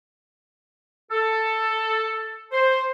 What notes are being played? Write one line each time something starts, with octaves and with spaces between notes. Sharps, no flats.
A4
C5